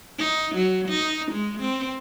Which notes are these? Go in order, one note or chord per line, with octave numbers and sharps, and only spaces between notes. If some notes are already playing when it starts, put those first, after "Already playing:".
D#4
F#3
D#4
G#3
C4